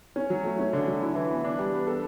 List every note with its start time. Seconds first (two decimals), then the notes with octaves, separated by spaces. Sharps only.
0.16 C#4
0.30 F#3
0.44 A3
0.59 C#4
0.73 D3
0.88 F#3
1.01 E4
1.15 E3
1.30 B3
1.44 D4
1.59 G3
1.73 B3
1.87 A4